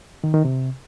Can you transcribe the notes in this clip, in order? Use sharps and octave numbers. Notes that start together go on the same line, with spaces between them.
D#3
D#3
C3